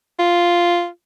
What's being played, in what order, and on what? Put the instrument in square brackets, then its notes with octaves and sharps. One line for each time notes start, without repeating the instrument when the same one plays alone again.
[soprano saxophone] F4